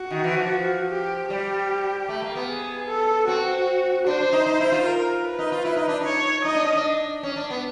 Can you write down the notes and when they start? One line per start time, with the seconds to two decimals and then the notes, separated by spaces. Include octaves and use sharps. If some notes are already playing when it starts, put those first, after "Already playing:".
Already playing: F#4
0.11 D#3
0.24 E3
0.37 F3
0.90 G4
1.29 G3 G4
2.08 A3
2.22 A#3
2.35 B3
2.48 G#4
2.88 A4
3.28 C4 F#4
4.07 D4 C5
4.20 D4
4.33 D#4
4.46 D#4
4.60 E4
4.72 F4
4.85 A#4
5.25 B4
5.39 D#4
5.52 F4
5.65 E4
5.77 D#4
5.88 D4
6.00 D#4 C#5
6.45 D#4 D#5
6.55 D4
6.65 C#4
6.75 D4
7.23 C#4
7.36 D4
7.50 B3